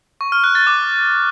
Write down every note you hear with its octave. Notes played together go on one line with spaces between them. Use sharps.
C#6
F6
F#6
A6
D6